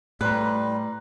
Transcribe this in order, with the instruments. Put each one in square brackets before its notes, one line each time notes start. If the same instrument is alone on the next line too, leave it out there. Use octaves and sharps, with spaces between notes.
[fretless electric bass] A2 [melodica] G3 [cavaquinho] B4 [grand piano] A#5 C6 F#6